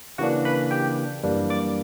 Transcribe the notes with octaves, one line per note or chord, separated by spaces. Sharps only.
C#3 E3 A#3 D4 F#4 F#5
B4 B5
G4 G5
F#2 E3 G3 A#3 D4
D5 D6